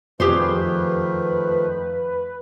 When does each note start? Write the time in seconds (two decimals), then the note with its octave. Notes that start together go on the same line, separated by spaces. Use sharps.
0.20 F2 D#3 F3 A3 G4 G#4 B4 C5